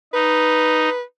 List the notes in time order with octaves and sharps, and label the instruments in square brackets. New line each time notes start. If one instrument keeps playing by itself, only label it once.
[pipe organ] D#4 [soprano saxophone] B4